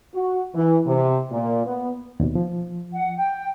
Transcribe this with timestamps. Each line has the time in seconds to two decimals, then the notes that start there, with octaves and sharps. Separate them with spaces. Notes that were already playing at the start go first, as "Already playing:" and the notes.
0.14 F#4
0.55 E3
0.86 C3
1.31 A#2
1.66 B3
2.20 D#2 B2
2.35 F3
2.92 F#5
3.15 G5